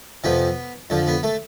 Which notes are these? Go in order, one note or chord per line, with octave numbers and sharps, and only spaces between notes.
F2 C3 F3 B3
F2 D3 F3
B3
A3